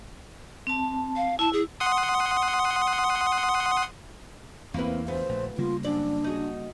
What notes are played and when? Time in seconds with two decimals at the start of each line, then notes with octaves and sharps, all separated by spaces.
0.67 C4 A5
1.16 F5
1.39 E4 A5
1.53 G#4
1.80 F#5 C6 D#6
4.74 E2 A#3 C4 E4 B4
5.08 D2 B3 C5
5.29 A#1 A3
5.58 C#3 G3 A#3 F4
5.84 F#2 D4 D5
6.24 D#4 F#4 G#4